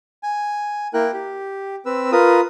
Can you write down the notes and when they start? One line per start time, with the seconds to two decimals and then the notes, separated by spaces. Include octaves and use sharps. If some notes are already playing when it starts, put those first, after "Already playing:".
0.23 G#5
0.94 A#3 E4 A#4 G5 F#6
1.13 G4
1.86 C4 B4 E6
2.12 F4 A#4 B4 D#6